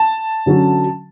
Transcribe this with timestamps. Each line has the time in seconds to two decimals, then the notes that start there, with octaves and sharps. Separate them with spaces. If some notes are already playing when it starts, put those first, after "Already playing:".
Already playing: A5
0.46 D3 F#3 C#4 F#4